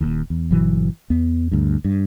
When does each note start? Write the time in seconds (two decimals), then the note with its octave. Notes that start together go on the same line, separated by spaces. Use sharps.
0.01 D#1 D#2
0.30 E2
0.51 G1 B2 E3 F#3
1.10 E2 B3
1.52 D2 G2
1.85 G2